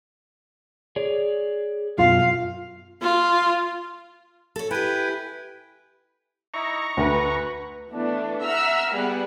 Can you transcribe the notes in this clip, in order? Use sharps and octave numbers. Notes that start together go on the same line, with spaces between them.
G#4 C#5 D5
F#2 B2 F4 F5
F4
A4 C#5
E4 G4 B4 G5 G#5
D#4 E4 A#5 C#6
D2 B4
E3 A3 B3 D4
E5 F#5 A#5 E6 F6
G3 B3 G#4 F#5